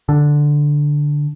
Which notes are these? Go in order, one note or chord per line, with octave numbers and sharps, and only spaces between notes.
D3